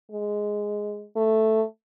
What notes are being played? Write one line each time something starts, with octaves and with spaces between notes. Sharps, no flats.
G#3
A3